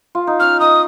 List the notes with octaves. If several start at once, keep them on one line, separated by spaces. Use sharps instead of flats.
F4
D#4
C#4 F6
D#4 D#6